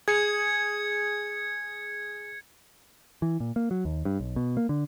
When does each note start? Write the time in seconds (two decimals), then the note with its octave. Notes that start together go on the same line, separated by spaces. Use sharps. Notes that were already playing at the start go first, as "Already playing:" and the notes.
0.08 G#4 G#6 C#7
3.22 E3
3.40 A#2
3.56 A#3
3.71 F#3
3.85 D#2
4.05 G2
4.20 B1
4.36 B2
4.57 A#3
4.69 D3